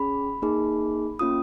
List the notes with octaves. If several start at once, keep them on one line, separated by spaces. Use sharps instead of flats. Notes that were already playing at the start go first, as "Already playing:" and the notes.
Already playing: C#4 G#4 B5
A#3 D#4 G#4
A#3 C#4 F4 D#6